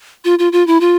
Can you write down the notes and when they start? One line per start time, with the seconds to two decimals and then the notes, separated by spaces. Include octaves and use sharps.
0.25 F4
0.39 F4
0.52 F4
0.67 E4
0.80 F4